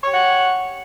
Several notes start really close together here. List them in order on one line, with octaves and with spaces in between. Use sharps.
C#5 G4 F#5